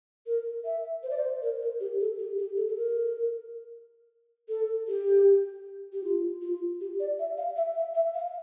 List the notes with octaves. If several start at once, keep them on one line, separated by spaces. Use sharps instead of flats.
A#4
E5
C5
D5
C5
A#4
A#4
G4
A4
G4
G4
A4
A4
A#4
A4
G4
G4
F4
F4
G4
D5
E5
F5
E5
E5
E5
F5